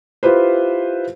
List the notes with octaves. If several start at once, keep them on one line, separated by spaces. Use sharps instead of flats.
E4 F4 G4 B4 C5